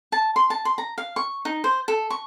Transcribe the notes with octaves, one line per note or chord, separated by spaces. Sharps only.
A5
C6
A5
C6
A#5
F5
C#6
D#4
C5
A4
C#6